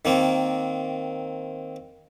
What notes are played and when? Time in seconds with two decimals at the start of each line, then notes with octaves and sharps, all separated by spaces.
0.05 D#3 A#3 C4